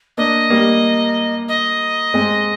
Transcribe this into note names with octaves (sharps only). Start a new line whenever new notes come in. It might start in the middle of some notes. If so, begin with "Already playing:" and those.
A#3 D4 D#5
G3 A#3
D#5
G#3 C4